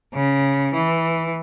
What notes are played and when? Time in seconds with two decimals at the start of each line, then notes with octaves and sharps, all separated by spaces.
0.14 C#3
0.73 E3